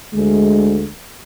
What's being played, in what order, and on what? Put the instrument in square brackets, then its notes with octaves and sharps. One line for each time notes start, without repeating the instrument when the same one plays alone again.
[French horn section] D2 D3 G#3